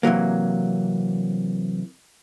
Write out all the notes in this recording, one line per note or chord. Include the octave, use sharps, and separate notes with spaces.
C3 E3 F#3 A#3